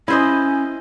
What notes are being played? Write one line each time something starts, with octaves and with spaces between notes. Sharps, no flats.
C#4 E4 C5 D#5